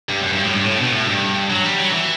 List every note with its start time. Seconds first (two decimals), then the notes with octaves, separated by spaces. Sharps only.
0.09 G2
0.22 F#2
0.32 G2
0.43 A2
0.54 G2
0.64 A2
0.79 B2
0.93 A2
1.07 G2
1.50 F#3
1.65 G3
1.78 F#3
1.92 E3